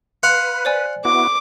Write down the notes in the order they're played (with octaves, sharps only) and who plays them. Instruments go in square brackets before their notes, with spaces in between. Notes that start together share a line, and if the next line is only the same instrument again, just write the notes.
[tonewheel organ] B4 [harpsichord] F5 F#5 C6
[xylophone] C5 D5 G#5
[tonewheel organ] B3 E4 F#4 [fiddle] D6